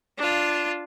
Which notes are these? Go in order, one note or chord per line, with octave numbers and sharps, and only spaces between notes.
D4 F4 F5